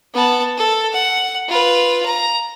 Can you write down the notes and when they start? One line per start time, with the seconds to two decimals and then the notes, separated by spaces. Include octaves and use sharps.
0.14 B3 A5
0.58 A4
0.93 F#5
1.49 F4 B4
2.06 A#5